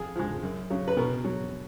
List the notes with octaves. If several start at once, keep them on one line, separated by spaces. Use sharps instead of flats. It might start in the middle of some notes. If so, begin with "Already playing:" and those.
Already playing: F2 G#4
F3 G#3
F#2
C#3 F#3
B4
B2 A#4
F#3